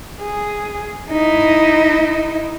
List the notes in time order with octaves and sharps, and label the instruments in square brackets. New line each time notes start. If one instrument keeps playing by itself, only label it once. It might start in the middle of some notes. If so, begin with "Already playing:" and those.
[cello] G#4
D#4 E4